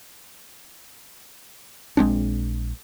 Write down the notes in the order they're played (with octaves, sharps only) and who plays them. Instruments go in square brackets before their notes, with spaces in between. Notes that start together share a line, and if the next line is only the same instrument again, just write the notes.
[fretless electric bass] A#1 G#3 C4 D4